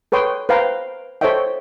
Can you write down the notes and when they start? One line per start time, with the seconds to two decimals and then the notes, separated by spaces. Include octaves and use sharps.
0.12 A4 B4 C#5 G5 C6 D#6
0.49 B4 C5 F5 G5 A#5
1.21 A4 C5 C#5 D#5 E5 G5